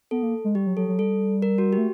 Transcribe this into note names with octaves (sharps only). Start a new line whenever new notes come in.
B3 A4
A#3
G#3
G3 G4
F#3
F#3 A4
F#3
G3 A4
A#4
F#4
G4
A3